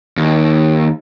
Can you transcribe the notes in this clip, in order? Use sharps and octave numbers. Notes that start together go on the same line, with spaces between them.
D#2